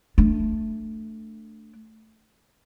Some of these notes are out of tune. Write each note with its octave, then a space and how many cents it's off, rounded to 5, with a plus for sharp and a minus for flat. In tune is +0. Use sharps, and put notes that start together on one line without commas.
A3 +0 D4 +0